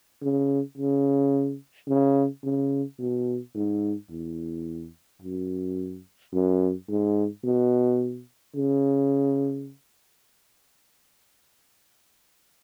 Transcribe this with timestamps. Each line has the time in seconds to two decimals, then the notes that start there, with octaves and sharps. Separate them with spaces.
0.22 C#3
0.78 C#3
1.88 C#3
2.44 C#3
2.99 B2
3.55 G#2
4.11 E2
5.22 F#2
6.34 F#2
6.89 G#2
7.45 B2
8.56 C#3